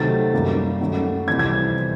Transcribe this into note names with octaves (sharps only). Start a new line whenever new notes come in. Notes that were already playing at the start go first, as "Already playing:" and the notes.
Already playing: C3 D#3 F#3 A3 A6
F#2 D#3 G3 A#3
F#2 D#3 F#3 A3
F2 C3 E3 G3 G#6
G#6